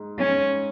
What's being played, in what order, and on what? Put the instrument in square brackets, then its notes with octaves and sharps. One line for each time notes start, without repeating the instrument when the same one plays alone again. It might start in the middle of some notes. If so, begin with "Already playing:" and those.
Already playing: [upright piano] G#2
[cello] C#4